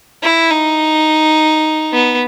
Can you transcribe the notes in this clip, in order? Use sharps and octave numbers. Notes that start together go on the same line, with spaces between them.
E4
D#4
B3